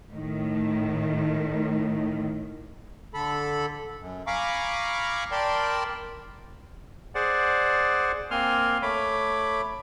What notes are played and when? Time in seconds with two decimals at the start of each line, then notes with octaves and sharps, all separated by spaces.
0.12 A2 D#3
3.14 D3 A4 B5
3.99 F#2
4.27 F5 G#5 A#5 B5 C#6 D6
5.31 A#4 D5 G5 A5 B5 C6
7.15 G#4 C5 D5 F#5
8.31 A#3 C4 G#5 C6 F6
8.82 A3 C#5 B5 D6